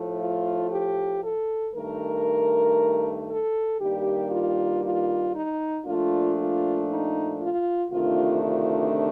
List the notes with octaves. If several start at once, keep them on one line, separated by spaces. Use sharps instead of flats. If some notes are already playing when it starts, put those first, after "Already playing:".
Already playing: A2 F3 A3
F4
G4
A4
G2 D#3 A3 A#4
A4
G2 D#3 G3 A#3 G4
F4
F4
D#4
A#2 F3 A3 D4 F4
F4
D#4
F4
D2 C3 D#3 A3 D4 F4
F4